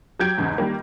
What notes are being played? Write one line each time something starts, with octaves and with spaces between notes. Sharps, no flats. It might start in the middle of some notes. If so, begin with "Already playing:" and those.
F#3 G4 G6 G#6 D7
E2 G#2 C#3
D#3 G3 A#3